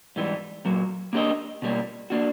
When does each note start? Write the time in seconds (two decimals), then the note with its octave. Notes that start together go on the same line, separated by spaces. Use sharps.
0.16 G#2 E3 G3 B3
0.65 A#2 F#3 A#3
1.13 A#3 D4 G4 A#4 D#5
1.62 B2 G3 A#3
2.10 A#3 D4 F#4